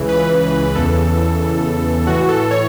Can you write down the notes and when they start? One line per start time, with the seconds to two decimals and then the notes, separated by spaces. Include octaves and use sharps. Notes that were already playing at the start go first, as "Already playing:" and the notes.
Already playing: C#2 C#3 E3
0.09 B4
0.75 E2 C#3 E3 A4
2.07 A2 E3 F#4
2.29 A4
2.51 C#5